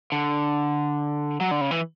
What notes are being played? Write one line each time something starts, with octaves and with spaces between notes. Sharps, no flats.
D3
F#3
D3
C#3
E3